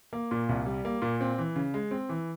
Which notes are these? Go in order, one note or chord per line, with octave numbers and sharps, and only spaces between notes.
A#3
A#2
C2
G3
A#3
A#2
C4
E3
C#3
G#3
C4
E3